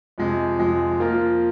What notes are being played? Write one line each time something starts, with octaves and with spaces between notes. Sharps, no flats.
F2 C3 F3 G#3
F2 C3 F3 G#3
F3 A#3 F4 A#4